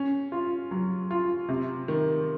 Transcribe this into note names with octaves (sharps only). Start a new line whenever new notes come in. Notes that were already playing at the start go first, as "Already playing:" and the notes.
Already playing: C#4
F4
F#3
F4
C3
D#3